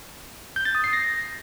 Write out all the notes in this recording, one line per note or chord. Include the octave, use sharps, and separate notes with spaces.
G6
A6
D#6
C7
A#6